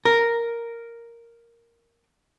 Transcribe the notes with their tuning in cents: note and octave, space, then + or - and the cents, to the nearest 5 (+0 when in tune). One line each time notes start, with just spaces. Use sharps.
A#4 +0